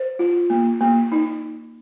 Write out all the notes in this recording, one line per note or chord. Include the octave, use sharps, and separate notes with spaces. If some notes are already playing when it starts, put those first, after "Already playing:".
Already playing: C5
F4
A#3
A#3
D#4